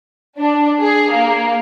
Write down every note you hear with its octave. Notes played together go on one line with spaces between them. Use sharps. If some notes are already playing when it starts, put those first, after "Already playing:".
D4
G#4
A#3